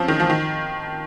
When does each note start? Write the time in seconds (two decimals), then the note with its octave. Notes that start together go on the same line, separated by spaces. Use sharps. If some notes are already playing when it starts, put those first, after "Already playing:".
Already playing: F3 C4 C#4
0.08 D#3
0.20 F3
0.30 D#3